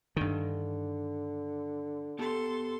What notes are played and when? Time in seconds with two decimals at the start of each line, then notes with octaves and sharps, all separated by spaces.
0.17 G2 D3 D#3
2.19 B3 G4 A4 A5 C6